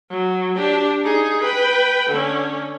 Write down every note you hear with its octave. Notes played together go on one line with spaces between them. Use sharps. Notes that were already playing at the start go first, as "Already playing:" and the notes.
F#3
D4 G4
D#4 G#4
B4 G5
D3 C#4